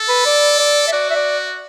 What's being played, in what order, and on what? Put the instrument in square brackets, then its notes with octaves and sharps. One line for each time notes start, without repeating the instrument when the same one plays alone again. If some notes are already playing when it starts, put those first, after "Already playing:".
Already playing: [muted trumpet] A4
[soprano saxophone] B4
D5
D5
E5
[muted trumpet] F#4 [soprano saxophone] D5
[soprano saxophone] E5
D5